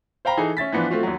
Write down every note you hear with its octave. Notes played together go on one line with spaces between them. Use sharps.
C5 F5 G5 A#5 B5
E3 D#4 G#4 A4
C#4 E5 A6 B6
E3 F3 B3 D4 F4
A3 C4 F4 F#4
D#2 F#3